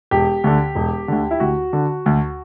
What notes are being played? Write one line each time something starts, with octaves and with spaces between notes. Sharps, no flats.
E1 G4
D2 D3
E1
D2 D3
E4
D2 F#4
D3
D2